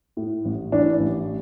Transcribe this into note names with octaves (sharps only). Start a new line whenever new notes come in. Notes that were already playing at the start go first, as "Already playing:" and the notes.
A2
A1
E3 D4
A1